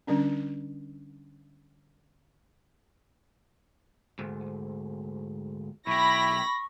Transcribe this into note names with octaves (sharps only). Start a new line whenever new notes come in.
D3 G3 C#4 D4
D2 G#2
B1 E4 G4 B5 C#6 A#6